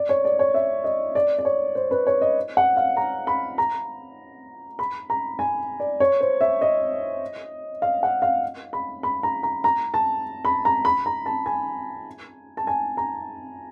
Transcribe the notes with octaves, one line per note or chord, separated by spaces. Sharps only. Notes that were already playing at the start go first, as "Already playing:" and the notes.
Already playing: D5
C#5
D5
C#5
E5
D#5
D5
D5
C#5
C5
B4
C#5
D#5
F#5
F5
A#5
B5
A#5
B5
A#5
G#5
D5
C#5
C5
E5
D#5
F5
F#5
F5
B5
B5
A#5
A#5
A#5
A5
B5
A#5
B5
A#5
A5
G#5
A5
G#5
A#5